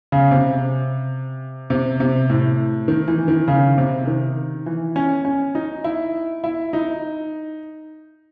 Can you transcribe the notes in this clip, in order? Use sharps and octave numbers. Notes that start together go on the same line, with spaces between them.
C#3
C3
C3
C3
A2
D#3
E3
D#3
C#3
C3
D#3
E3
C#4
C#4
D#4
E4
E4
D#4